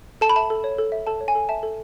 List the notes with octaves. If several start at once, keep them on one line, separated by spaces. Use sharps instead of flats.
A4 A5
B5
E5 A5
A4
C#5
A4
E5
A4 A5
C#5
G#5
A4
E5 A5
A4